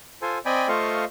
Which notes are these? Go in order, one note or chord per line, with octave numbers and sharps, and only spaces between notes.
F4 A4 C5 G#5
C4 D5 D#5 G5 G#5 B5
A3 F4 C5 D#5 F5 C#6